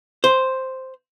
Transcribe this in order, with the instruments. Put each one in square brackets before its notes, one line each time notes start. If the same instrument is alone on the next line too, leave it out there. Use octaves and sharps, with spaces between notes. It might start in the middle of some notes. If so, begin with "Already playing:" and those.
[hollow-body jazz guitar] C5